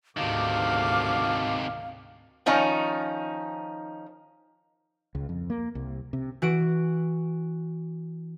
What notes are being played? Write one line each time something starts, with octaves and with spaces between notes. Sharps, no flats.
D2 G#2 C3 D#3 F#4 F5 A5 D6
D#3 F3 C#4 D#4
C#2
F2
A#3
C2
C3
E3 F#4 D7